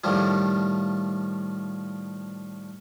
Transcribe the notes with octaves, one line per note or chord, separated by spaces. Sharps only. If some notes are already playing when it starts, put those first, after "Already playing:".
A2 D#3 F3 G3